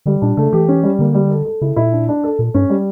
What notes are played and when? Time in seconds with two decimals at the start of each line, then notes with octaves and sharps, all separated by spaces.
0.06 D3 G3
0.22 A#2 D4
0.37 C#3 A3
0.53 E3 G4
0.68 C#4
0.83 G3
0.99 D3 A#3
1.14 G3
1.30 A4
1.45 A4
1.61 C#3 E4
1.76 A#2 E4
1.92 D4
2.08 D4
2.24 A4
2.39 A#2 A4
2.54 G2 C#4
2.69 G3